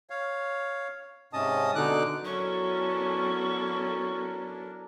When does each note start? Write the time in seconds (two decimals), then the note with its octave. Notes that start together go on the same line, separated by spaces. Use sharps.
0.10 C#5 F5
1.33 G#2 C3 C#4 D#5 A5 D#6
1.75 B2 D3 D#4 D6 F#6
2.25 F#3 B3 C#4 D4 E4 A4 A#4 C#6